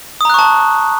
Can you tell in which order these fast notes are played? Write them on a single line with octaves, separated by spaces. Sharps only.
D#6 A#5 F#6 C#6 A5